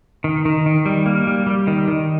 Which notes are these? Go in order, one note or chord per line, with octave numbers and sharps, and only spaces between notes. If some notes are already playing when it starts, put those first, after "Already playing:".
D#3
D#3
D#3
G3
A#3
G3
G3
D#3
D#3